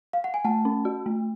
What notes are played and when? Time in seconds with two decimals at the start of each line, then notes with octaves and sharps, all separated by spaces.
0.13 F5
0.24 F#5
0.34 G#5
0.45 A3 F#5 A5
0.65 C#4
0.85 F#4
1.06 A3